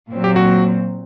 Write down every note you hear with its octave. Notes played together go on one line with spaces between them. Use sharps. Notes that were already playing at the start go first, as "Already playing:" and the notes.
A#2 F#3 C4
G4
F#4